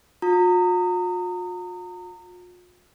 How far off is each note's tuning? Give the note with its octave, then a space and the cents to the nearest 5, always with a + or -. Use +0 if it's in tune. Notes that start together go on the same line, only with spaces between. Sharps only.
F4 +45 A#5 -30 D#6 +0